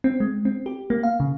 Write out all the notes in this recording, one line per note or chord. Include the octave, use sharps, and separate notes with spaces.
C4
G#3
C4
G4
A#3
F5
C#3